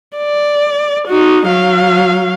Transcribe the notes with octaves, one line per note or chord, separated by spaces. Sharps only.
D5
D#4 F#4
F#3 F5